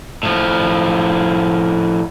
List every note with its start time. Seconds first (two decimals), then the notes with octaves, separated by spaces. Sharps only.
0.23 A2 F3